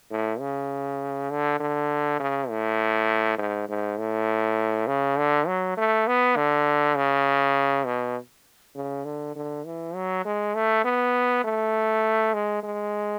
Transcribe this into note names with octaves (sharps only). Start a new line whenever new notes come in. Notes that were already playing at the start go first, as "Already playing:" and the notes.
A2
C#3
D3
D3
C#3
A2
G#2
G#2
A2
C#3
D3
F#3
A3
B3
D3
C#3
B2
C#3
D3
D3
E3
F#3
G#3
A3
B3
A3
G#3
G#3